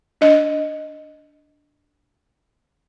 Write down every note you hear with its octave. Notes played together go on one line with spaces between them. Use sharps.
D4 D#5